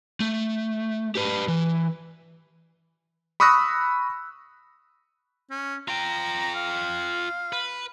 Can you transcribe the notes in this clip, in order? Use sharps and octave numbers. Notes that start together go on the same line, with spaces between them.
A3
G4 B4
E3
B5 C#6 D#6 E6 F#6 A#6
C#4
F4 G5 A#5
F5
B4